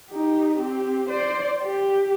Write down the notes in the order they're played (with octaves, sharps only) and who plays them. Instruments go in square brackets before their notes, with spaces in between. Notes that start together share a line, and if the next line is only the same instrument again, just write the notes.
[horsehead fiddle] D#4 G4
C4 G4
C5 D5
G4